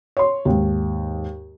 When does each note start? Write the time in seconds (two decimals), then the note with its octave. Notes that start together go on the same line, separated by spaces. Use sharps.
0.17 C#5 C6
0.45 D#2 G#2